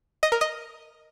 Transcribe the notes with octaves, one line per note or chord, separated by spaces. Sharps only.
D#5
A#4
D#5